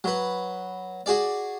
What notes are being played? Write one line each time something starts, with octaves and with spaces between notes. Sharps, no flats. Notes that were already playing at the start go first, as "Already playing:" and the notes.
F#3 B4
F#4 G#4 D5